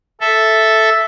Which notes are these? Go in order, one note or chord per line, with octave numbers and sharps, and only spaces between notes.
A4 E5